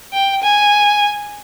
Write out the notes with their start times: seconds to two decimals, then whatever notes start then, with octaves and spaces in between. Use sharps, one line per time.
0.13 G5
0.42 G#5